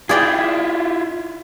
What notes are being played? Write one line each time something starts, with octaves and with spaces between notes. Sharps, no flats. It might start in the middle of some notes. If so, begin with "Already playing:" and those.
E4 F4 G#4 D5 G5